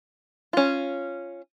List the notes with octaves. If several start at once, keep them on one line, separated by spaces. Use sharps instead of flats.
C#4 F4